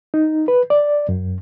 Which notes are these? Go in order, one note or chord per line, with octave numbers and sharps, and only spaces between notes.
D#4
B4
D5
F#2